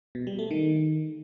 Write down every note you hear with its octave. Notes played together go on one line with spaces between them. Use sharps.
B2
G3
A3
D#3